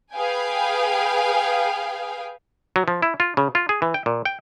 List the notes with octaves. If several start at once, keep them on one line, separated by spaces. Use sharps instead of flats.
G#4 B4 F5 G5 G#5
F#3
F3
E4
F4
C#3
F4
G#4
E3
G5
A#2
G5